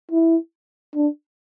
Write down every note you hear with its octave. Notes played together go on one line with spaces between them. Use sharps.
E4
D4